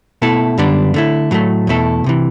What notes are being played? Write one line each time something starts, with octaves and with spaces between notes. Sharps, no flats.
B2 A3 E4 A4
F#2 D3 G3 B3 D4
D3 A3 E4
A2 F#3 A3
E2 B2 A3 E4 A4
C2 C3 E3